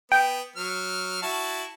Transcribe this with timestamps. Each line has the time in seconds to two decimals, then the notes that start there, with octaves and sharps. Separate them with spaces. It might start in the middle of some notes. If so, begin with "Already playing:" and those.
0.12 B3 G5
0.57 F#3 F6
1.22 E4 F#4 A5